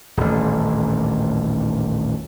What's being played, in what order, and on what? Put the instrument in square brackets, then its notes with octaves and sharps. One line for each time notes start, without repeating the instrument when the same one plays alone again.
[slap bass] D#1 A1